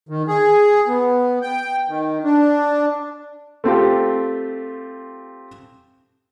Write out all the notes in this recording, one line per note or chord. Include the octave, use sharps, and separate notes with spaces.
D#3
G#4
B3
G5
D#3
D4
A3 C4 F4 G4